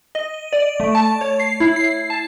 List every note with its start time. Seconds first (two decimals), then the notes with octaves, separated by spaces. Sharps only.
0.15 D#5
0.53 D5
0.80 A3
0.95 A5
1.21 C#5
1.40 C7
1.60 E4
1.76 C7
2.10 A5